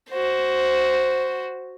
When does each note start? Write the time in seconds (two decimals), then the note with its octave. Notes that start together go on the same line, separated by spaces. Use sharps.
0.10 F#4 C5